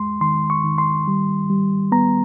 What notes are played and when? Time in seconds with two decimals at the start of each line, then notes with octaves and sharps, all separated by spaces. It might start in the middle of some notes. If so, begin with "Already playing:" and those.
Already playing: E2 G#3 C6
0.21 D#3 C6
0.50 C#6
0.64 D#3
0.78 C6
1.07 G3
1.50 G3
1.92 B3 A#5